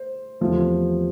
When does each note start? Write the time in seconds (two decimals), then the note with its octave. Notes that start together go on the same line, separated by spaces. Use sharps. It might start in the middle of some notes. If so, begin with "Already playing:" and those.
Already playing: C5
0.41 E2 C3 F3 A3